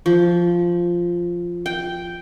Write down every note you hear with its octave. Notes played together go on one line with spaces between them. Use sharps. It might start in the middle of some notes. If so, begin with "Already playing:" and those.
F3
G5